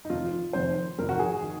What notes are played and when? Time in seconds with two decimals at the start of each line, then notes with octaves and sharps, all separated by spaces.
0.05 D#4
0.10 F1 F2 D#3 F4
0.53 F1 F2 D#3 C5
0.99 F1 F2 D#3 A#4
1.09 F#4
1.20 G#4
1.42 D#3